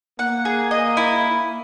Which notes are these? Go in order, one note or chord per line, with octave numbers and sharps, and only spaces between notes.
A#3 F#5
G#4
D#5
E4